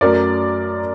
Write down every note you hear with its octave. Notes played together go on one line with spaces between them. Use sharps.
F#2 F#3 A3 A#4 D5